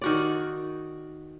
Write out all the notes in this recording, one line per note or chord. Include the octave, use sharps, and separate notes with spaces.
D#3 F#4 D5